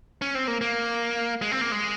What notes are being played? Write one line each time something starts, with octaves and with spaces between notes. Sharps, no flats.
C#4
C4
A#3
A#3
G#3
C4
A#3
G#3